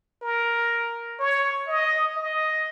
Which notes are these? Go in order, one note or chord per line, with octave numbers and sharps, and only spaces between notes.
A#4
C#5
D#5
D#5